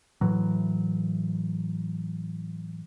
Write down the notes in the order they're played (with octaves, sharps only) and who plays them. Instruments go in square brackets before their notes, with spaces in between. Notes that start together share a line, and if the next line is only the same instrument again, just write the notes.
[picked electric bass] A2 E3 F#3